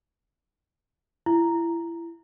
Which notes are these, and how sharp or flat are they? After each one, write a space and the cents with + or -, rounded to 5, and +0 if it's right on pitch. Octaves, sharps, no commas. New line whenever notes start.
E4 +30